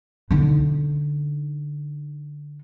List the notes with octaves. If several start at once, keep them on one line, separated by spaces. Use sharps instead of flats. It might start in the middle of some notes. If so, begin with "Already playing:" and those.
D3 D#4